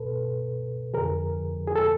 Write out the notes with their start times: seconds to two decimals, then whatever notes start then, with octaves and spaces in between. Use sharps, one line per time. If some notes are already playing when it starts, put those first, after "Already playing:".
Already playing: C#2 B2 A4 B4
0.93 F2 D3 F3 G#4 A#4
1.67 G#4
1.76 A4